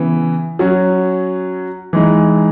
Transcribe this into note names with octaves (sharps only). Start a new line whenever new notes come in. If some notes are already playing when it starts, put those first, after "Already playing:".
Already playing: C#3 E3 B3
F#3 C#4 F#4
E3 G#3 D#4